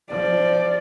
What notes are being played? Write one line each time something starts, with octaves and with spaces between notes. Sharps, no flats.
F3 D5